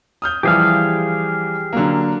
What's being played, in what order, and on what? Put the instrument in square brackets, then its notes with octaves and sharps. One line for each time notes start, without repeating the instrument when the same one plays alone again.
[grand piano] D#6 F6 G6
[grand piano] E3 F3 G3 [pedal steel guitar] G4 G#4 F5
[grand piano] D3 F#3 A#3